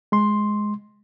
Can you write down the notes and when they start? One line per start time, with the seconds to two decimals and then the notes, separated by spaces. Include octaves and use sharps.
0.12 G#3 C6